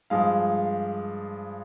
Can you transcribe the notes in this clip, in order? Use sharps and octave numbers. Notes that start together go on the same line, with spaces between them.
G2 F3 G#3 F5